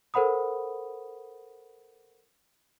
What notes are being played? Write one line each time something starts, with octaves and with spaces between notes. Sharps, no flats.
A4 A#4 C5 F#5 B5 D#6